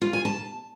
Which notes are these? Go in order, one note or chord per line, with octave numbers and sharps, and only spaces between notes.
F4
G#5
A5